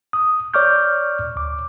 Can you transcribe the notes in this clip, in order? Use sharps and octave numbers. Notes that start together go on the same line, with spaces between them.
D#6
C#5 D5 C#6 D6 F6 G6
D2 D6